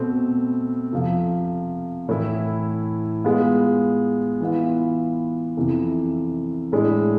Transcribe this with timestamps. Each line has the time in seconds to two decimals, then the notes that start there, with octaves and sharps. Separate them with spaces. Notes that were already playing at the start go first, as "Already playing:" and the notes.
Already playing: B2 A3 C4
0.92 F2 C3 F3
2.09 A2 E3 A3 E4
3.24 G#3 B3 F4
4.40 E3 B3 F4
5.57 F2 C3 E3
6.72 A2 G#3 D4